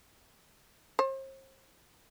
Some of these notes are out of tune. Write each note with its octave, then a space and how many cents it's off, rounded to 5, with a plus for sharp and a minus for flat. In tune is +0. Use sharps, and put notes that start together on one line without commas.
C5 +40